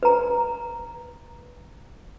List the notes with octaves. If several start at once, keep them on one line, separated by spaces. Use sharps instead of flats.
B4 A#5